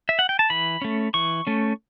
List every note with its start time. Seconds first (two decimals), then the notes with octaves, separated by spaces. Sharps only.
0.09 E5
0.19 F#5
0.29 G5
0.39 A5
0.50 E3 B5
0.82 A3 C#4
1.14 E3 C#6
1.47 A3 C#4